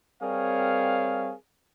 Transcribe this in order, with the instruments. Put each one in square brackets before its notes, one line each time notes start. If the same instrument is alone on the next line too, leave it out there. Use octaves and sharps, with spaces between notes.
[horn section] G3 C4 G#4 A#4 C#5 F5